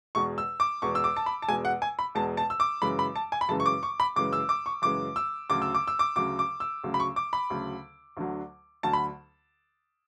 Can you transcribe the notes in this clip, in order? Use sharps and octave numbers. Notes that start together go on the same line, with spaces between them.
E2 B2 G#3 C#6
E6
D6
E2 B2 G#3 C#6
E6
D6
A5
B5
A5
E2 B2 G#3 G#5
F#5
G#5
B5
E2 B2 G#3 A5
A5
E6
D6
F#2 C#3 E3 G#3 B5
B5
A5
G#5
B5
F#2 C#3 E3 G#3 A5
C#6
D6
C#6
B5
F#2 C#3 E3 G#3 D6
E6
D6
C#6
F#2 C#3 E3 G#3 D6
E6
D2 C#3 F#3 D6
E6
D6
E6
D6
D2 C#3 F#3 D6
D6
E6
D2 C#3 F#3
B5
C#6
D6
B5
D2 C#3 F#3
D2 D3 F#3
D2 D3 F#3 A5
B5